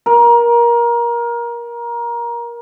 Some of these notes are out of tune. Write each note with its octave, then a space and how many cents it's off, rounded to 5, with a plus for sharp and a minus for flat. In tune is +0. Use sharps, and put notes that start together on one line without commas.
A#4 +20